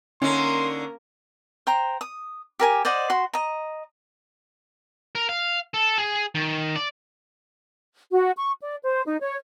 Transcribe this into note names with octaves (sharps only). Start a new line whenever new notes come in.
D3 A#3 C#4 D#4 A#4 C6
C5 G5 A#5
D#6
G4 A#4 G#5
C5 D5 D#5 F#5
F#4 C6
D#5 A#5
A#4
F5
A4
G#4
D#3
D5
F#4
C#6
D5
C5
D#4
C#5